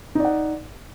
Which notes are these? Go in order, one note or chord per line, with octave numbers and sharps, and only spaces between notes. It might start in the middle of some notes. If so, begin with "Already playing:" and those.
D#4 D5 F#5